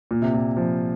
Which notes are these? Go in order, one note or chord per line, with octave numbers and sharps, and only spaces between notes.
A#2
C3
A#2
F3